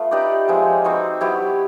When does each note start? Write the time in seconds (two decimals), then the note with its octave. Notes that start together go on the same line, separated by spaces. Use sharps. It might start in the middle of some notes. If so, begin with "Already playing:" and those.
Already playing: A3 B3 F4
0.11 D#4 G4 B4 D5
0.48 F3 G#3 C4
0.84 C4 D#4 F#4 B4
1.21 F#3 B3 E4 G4